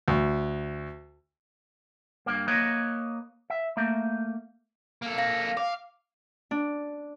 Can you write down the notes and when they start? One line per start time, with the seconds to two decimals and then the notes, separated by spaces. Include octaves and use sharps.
0.08 D2
2.26 G2 A#3
2.48 A#3 B4 C#5 D#5
3.50 E5
3.77 A3 A#3
5.02 A#3 A4
5.18 F5 A#6
5.57 F5 D6
6.51 D4